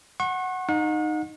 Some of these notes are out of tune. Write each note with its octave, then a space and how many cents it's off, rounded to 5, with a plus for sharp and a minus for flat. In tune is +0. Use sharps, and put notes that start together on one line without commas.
F#5 +0 C#6 -40
D#4 -15 F#5 -40